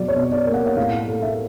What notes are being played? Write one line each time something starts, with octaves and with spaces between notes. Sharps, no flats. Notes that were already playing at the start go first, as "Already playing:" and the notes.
Already playing: B2 F#3 D5
C#5
B2
D5
A#3
F#5
F#5
A2 F5
A3
E5